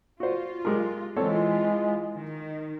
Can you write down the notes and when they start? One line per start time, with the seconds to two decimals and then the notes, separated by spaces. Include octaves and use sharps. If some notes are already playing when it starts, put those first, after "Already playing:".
0.20 F4 F#4 C5
0.65 G#3 G4 A#4
1.16 E3 G#3 C4 F4 A4 C#5
2.15 D#3